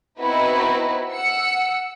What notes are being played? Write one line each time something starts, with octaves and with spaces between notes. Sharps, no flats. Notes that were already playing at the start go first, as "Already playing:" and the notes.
B3 C4 D#4 E4 F#4 B4
F#5 E6 C#7